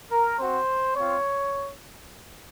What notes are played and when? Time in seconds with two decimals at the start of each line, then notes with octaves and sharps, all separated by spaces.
0.10 A#4
0.38 C4 F#4 C5
0.95 C4 F4 C#5